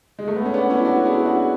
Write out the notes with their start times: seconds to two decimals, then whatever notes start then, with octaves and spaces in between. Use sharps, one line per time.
0.19 G#3
0.28 A3
0.36 B3
0.45 C#4
0.54 B3 D4
0.70 C#4 E4
0.84 D4 F#4
1.06 E4 G#4
1.26 D4 F#4